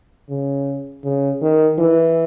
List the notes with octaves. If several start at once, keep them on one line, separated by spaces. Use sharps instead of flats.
C#3
C#3
D#3
E3